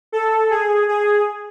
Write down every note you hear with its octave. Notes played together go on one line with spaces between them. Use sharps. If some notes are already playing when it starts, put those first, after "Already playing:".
A4
G#4
G#4